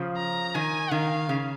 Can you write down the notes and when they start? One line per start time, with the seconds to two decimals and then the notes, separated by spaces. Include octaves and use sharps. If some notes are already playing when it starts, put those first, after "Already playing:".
Already playing: C#3 F3
0.18 A#5
0.55 D#3 G#5
0.91 D#3 F5
1.29 C#3